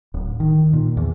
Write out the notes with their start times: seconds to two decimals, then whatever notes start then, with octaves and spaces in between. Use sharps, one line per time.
0.14 D1
0.40 D#3
0.73 A#2
0.97 E2